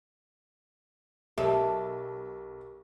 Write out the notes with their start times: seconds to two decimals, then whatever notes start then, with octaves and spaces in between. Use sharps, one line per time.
1.38 B1 G4 A4 A#4 E5